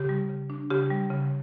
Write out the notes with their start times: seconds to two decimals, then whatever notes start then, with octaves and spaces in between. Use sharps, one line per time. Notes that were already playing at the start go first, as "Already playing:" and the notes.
Already playing: C#3 G4
0.09 G3
0.30 C#3
0.50 D4
0.70 C#3 G4
0.91 G3
1.10 C#3